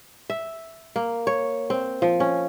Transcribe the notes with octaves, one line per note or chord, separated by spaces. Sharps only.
E5
A#3
C#5
C4
F3
C#4